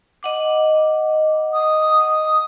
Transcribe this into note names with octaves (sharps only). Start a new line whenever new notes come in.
D#5 F#5 D6
D#6